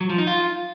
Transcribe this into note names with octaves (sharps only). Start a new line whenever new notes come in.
F#3
F3
D#4
F4